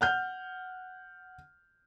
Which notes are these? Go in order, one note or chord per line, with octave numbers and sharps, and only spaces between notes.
F#5 F6 G6